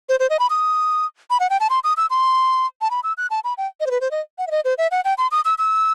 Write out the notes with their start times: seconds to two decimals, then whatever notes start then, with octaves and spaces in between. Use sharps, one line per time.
0.09 C5
0.20 C5
0.30 D#5
0.40 B5
0.50 D#6
1.30 B5
1.40 F#5
1.50 G5
1.60 A5
1.70 C6
1.84 D#6
1.97 E6
2.10 C6
2.81 A5
2.91 B5
3.04 E6
3.18 F#6
3.30 A5
3.44 B5
3.58 G5
3.80 D#5
3.86 C5
3.91 B4
4.01 C5
4.11 D#5
4.38 F#5
4.47 E5
4.51 D#5
4.65 C5
4.78 E5
4.91 F#5
5.05 G5
5.18 C6
5.31 D#6
5.45 E6
5.58 E6